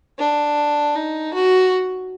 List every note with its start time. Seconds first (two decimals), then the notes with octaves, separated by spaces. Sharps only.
0.18 D4
0.95 D#4
1.34 F#4